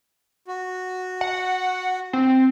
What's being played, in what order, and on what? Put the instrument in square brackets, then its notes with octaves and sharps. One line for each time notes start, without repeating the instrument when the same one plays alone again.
[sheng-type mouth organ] F#4
[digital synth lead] F#5
C4